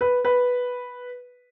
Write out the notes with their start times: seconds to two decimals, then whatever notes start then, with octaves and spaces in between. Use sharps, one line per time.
0.01 B4
0.25 B4